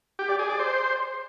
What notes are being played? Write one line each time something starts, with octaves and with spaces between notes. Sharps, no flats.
G4
D5
G#4
D5
C5